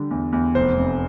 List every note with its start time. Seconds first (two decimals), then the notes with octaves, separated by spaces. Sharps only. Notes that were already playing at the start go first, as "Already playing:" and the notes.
Already playing: D3 G3
0.11 E2
0.33 E2
0.55 F1 C5
0.78 F2